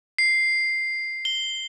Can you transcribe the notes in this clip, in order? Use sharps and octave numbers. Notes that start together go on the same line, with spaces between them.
C7
G7